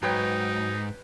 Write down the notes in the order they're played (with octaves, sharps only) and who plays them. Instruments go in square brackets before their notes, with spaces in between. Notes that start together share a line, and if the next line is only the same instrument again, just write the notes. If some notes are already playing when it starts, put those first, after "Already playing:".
[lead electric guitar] G#2 [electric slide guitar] F#3 [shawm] D#4 [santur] B4 C#5 G5